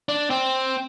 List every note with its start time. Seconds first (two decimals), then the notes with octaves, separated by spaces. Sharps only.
0.09 D4
0.30 C4